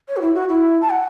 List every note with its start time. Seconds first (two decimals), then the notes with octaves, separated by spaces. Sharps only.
0.08 C#5
0.16 F#4
0.21 E4
0.35 F#4
0.49 E4
0.81 A5
0.90 F#5